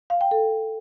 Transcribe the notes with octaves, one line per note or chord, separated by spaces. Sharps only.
F5
G5
A4